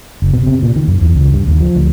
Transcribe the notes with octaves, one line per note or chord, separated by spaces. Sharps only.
F#1
B2
C3
A#2
D#3
F#2
E2
C#2
G2
D#2
F3
D2